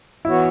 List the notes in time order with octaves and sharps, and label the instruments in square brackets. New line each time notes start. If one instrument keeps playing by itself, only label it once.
[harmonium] E3 B3 F#4 C#5 [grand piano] E4